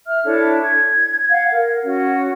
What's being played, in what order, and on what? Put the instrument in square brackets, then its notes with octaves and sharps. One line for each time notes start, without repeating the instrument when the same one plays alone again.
[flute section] E5 F6
D4 E4 A4 C#5
G#6
F5 F#5 G#6
A#4
C#4 F#4